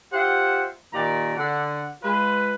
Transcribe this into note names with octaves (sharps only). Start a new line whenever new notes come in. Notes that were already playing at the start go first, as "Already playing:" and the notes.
F4 G4 C5 E5 F#5
A#2 D#3 G4 D5 A#5
D3 F#5
G#3 F4 B4